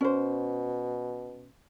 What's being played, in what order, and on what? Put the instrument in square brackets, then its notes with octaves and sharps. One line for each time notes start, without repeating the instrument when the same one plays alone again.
[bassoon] B2 [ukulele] C#4 C5